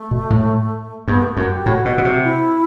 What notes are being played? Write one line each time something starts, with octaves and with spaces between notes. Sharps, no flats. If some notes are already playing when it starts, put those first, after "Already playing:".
Already playing: A3
B2
A2
G2 B3
A3
F#2 F#4
G4
A2 F#4
B2
B2
C3
E4